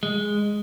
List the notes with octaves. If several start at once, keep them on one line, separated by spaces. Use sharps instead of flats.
G#3